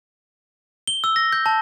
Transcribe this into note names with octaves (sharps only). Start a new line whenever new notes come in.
G7
E6
A#6
G6
A5